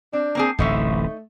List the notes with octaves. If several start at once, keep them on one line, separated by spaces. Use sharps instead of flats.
C4 D4
A#3 C4 G#4
D1 A1 C3 A3 D#4 C#5 E5